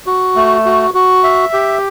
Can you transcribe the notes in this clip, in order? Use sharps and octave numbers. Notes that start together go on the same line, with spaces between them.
F#4
A3
F#4
F#4
E5
G4